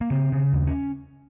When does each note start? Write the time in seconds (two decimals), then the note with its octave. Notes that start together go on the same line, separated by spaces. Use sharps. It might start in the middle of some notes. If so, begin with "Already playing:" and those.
0.01 A#3
0.11 C#3 C4
0.32 C#3
0.53 D#2
0.67 C#4